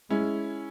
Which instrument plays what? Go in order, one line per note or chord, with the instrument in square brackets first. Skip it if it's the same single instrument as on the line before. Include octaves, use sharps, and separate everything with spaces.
[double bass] G#3 [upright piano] C#4 E4